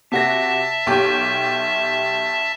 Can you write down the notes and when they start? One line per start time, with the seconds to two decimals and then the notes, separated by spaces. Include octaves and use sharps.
0.12 C3 F#4 E5 A5 A#6
0.86 B1 G4